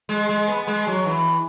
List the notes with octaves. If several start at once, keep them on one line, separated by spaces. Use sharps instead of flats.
G#3
G#3
B3
G#3
F#3
E3